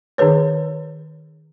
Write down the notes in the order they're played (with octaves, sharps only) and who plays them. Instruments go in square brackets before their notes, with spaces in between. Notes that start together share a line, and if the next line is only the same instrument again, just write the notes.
[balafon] D#3 D#4 G#4 B4 C#5